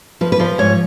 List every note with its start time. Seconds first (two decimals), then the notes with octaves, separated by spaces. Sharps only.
0.21 F3 B4
0.32 B4
0.39 F3 C5
0.58 G#2 C#5